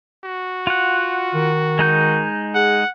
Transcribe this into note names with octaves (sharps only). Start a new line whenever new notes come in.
F#4
F4 F#5
D#3
G#3 D#4 G6
G#4 F#5